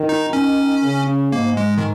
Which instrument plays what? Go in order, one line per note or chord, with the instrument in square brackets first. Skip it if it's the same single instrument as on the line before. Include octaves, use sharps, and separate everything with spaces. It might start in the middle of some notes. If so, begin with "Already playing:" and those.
Already playing: [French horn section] D#3
[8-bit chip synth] D#4
[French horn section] D#3 [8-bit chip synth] C#4
[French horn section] C#3
[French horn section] G#2 [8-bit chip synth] A#3
[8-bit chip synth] G#3
D#3